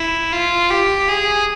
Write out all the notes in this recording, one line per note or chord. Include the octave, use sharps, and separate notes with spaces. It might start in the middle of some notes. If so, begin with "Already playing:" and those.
Already playing: E4
F4
G4
G#4